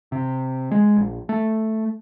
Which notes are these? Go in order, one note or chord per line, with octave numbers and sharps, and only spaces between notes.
C3
G#3
A#1
A3